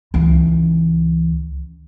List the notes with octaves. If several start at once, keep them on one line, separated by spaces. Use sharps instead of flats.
C#2 E3